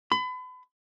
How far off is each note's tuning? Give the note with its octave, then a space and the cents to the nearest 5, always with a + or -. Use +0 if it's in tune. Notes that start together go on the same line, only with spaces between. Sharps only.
B5 +35